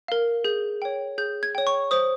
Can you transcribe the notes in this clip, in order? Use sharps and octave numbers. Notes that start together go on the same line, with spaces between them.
A#4 F5
G#4 G6
C#5 G5
G#4 G6
G#6
C#5 G5
C#6
C5 D#6